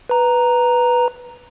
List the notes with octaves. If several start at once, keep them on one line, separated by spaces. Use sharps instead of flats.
B4 A#5